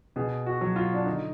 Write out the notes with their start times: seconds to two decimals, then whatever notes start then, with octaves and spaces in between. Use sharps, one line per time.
0.16 B2 G#4
0.46 F#4
0.61 F#3
0.76 F4
0.94 D4
1.06 D3 D#4